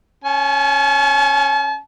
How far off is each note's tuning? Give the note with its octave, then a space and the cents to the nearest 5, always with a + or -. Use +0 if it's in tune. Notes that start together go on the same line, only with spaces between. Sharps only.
C#4 +0 A5 -45